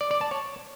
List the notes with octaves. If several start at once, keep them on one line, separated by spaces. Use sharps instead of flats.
D5
D5
A5
C#5